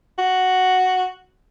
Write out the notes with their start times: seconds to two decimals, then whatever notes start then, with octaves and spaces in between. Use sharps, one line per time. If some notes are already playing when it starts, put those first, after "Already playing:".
0.18 F#4